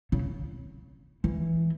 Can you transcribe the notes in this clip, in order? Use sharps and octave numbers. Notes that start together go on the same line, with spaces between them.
C#3
E3